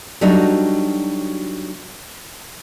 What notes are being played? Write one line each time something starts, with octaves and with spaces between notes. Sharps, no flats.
F#3 G3 A3 D4 D#4 F#4